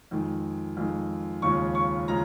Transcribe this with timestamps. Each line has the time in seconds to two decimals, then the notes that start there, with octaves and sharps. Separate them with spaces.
0.11 F2 D#3 G#3
0.77 F2 D#3 G#3
1.42 D#2 C#3 F3 G#3 C#6
1.75 C#6
2.08 C#3 F3 G#3 A#5